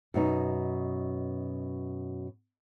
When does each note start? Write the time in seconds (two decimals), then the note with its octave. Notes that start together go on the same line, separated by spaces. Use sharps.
0.14 F#2 B2 D#4